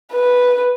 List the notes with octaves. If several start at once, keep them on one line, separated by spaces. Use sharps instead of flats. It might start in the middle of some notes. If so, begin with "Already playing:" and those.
B4